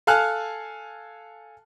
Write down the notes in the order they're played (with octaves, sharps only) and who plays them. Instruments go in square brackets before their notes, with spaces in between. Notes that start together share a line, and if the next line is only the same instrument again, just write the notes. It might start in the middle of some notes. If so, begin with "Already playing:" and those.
[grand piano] A4 F5 G#5 A5 F6 F#6